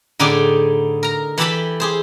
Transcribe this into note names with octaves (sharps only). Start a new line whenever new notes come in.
A2 D3 D#4 G4 G#4 D5
A#4 A#5
E3 E4 G4 A4 A5 B5
G4 G#4 C5